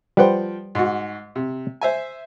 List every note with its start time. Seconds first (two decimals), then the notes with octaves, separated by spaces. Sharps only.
0.17 F3 G3 B4 C5 F#5 G5
0.75 G#2 F#4
1.36 C3
1.81 C5 E5 G#5